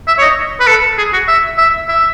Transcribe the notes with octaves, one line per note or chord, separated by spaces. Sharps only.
E5
C#5
D#5
B4
A4
G#4
F#4
E5
E5
E5